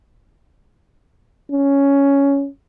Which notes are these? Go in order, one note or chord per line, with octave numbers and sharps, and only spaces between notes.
C#4